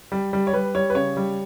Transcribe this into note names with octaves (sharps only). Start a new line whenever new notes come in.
G3
G3
C#5
G3 B4
G3 C#5
B4
C#3 C#5
G3